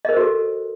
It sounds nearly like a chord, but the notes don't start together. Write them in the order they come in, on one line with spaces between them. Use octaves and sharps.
D#5 A#4 C5 F#4 A4